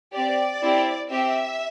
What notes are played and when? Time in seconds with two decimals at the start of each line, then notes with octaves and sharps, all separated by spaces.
0.13 C4 G4 D5
0.62 C4 E4 G4
1.10 C4 G4 E5